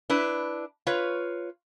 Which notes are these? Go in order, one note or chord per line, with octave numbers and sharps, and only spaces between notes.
D4 E4 B4
F4 B4 C#5